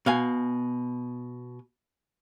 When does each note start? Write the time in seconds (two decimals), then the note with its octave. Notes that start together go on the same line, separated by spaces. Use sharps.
0.06 B2 F5 G#5